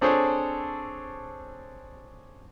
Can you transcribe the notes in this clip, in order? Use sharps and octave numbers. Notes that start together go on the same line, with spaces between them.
C4 D4 G#4 A4 C5 C#5